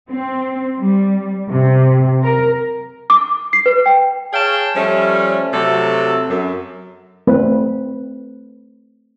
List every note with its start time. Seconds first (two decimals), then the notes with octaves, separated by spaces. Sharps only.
0.11 C4
0.79 G3
1.50 C3
2.23 A#4
3.10 D6
3.53 C7
3.66 B4
3.86 G5
4.33 G#4 C#5 F5 G5 A5
4.75 F3 G3 A3 C#4
5.53 C3 F#3 A3 A4
6.28 F#2
7.27 A3 C4 E4 B4